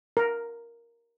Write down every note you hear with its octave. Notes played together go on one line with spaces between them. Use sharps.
A#4